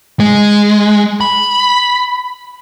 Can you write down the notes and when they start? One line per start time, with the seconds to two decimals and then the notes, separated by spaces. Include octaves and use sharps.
0.20 G#3
1.21 B5